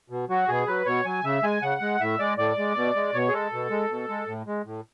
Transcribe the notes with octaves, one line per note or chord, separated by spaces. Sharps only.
B2
F#3 F#4
B2 G#4
F#3 B4
B2 C#5
F#3 G#5
C#3 E5
G#3 G#5
C#3 F#5
G#3
A2 E5
G#3 D5
A2 D5
G#3
B2
G#3
B2 C#5
G#4
G#3 A4
B2
G#3
B2
G#3
A2
G#3
A2